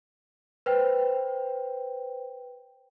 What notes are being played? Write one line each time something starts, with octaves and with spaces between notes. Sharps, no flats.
B4 C5 G5